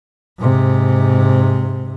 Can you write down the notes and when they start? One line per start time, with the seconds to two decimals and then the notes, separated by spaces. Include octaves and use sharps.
0.39 G#2 C3